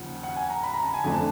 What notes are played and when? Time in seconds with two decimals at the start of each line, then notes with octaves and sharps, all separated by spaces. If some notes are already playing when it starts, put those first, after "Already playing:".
Already playing: D#2 C#3 F3 F#5
0.23 F#5
0.36 G#5
0.50 A#5
0.63 B5
0.73 A#5
0.83 A5
0.94 G#5
1.04 F2 D3 F3 A3 D4 G#5
1.14 A5